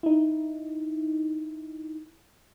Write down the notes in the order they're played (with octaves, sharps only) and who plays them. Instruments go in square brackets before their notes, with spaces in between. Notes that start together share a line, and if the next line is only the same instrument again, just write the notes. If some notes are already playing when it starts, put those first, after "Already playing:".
[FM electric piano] D#4 E4